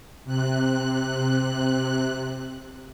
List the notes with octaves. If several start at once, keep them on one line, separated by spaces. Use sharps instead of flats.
C3 F#6